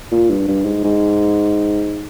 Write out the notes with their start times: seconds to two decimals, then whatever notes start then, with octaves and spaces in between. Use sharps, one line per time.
0.11 A#2
0.30 G2
0.47 G2
0.65 G#2
0.84 G#2